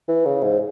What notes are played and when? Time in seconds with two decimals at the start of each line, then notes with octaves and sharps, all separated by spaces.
0.09 E3
0.25 C#3
0.43 G#2